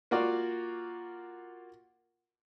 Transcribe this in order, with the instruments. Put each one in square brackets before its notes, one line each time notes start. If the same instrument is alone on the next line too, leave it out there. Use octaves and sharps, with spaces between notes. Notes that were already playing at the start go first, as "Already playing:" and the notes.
[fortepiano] A#3 F4 F#4 D5